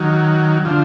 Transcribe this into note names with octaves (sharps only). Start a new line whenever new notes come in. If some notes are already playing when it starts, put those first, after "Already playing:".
Already playing: D#3 F#3
D3 F3